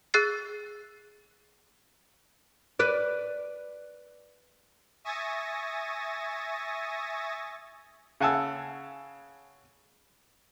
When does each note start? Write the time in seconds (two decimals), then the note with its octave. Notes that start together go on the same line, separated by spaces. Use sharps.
0.14 G#4 E6 F#6 A6 C7
2.79 B4 D5
5.04 E5 G#5 C#6 D#6 A6 A#6
8.20 C#3 F#5 G#5 A5 E6